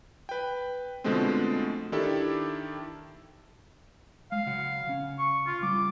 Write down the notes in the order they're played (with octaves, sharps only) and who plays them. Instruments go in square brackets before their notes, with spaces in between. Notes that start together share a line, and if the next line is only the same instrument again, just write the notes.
[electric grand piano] B4 G5
B2 D3 F3 G#3 A3 C4
D#3 D4 E4 G4 A4
[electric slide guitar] G#3 [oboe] F5
[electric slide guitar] C#3 F#3 F#5
C#3 C#4
[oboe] C#6
F4
[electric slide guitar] G3 F4 [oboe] D6